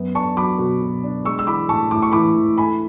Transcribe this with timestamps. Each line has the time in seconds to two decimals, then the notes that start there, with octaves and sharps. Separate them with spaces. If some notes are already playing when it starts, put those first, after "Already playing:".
Already playing: F#2 B3
0.15 D4 A5 C#6
0.37 F#3 B5 D6
0.59 B2
0.81 B2
1.04 D4
1.25 G#3 C#6 E6
1.39 E6
1.47 E3 B5 D6
1.69 A2 A5 C#6
1.91 A2 D6
2.02 C#6
2.11 E3 B5 D6
2.35 E3
2.58 A3 G#5 B5